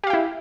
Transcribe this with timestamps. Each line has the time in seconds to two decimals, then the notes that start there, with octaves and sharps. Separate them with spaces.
0.04 G4
0.07 F5
0.10 G5
0.13 E4